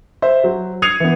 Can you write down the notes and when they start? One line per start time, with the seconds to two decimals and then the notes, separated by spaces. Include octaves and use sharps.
0.22 C5 E5
0.44 F#3
0.82 D#6 G#6 C7 C#7 D#7 F7
1.00 E3 B3